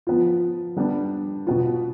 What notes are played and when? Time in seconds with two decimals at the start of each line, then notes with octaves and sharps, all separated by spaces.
0.07 F3 B3 F4
0.77 G3 B3 D4
1.47 B2 B3 F4